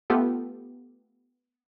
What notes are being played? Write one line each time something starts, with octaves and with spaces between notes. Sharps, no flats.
A3 B3 F4 G4 A4